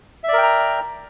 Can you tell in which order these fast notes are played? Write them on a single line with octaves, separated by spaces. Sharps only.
E5 D5 A#4 G5 A#5